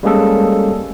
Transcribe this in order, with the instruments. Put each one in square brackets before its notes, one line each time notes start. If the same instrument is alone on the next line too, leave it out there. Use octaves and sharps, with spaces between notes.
[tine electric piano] G3 G#3 A#3 C#4 G#4 A4